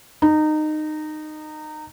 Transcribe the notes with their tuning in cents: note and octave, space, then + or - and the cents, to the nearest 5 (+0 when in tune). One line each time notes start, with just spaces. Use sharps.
D#4 -20